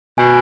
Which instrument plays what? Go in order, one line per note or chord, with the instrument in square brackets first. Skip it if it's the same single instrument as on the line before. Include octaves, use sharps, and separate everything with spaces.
[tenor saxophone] B2 [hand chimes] G#5